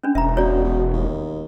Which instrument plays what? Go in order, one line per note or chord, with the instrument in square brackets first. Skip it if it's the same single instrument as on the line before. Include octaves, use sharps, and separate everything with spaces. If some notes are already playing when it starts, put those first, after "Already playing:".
[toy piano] C#4 D4
[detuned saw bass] E1 [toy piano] E5 A#5
[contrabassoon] B2 [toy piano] C#5 D5
[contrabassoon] B2
D#2